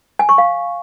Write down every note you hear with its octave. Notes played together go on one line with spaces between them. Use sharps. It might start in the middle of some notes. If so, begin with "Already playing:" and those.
G#5
C#6
F5